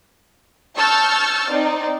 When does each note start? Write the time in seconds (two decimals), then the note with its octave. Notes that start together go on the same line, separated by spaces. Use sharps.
0.76 A5 C#6 E6 F6 G6 A6
1.50 C4 D#4 D5